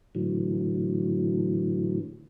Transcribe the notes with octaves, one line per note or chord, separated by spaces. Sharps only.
A2 D3 E3 F#3